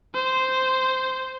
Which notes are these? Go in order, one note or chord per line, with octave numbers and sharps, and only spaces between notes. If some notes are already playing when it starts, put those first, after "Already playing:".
C5